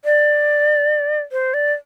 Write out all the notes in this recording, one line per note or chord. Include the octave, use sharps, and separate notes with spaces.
D5
C5
D5